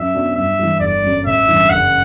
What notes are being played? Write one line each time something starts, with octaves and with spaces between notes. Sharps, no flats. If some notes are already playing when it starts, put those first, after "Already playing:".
Already playing: F#2 E5
F#3 B3 D4 F#4
G2 E5
E3 G3
G1 D5
F#2 F#3
A1 E5
G2 E3
F#1 F#5